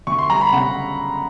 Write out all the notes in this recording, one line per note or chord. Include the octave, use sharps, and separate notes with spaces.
D2 C#6
C6
G3 A#5
B5
C#3 F#5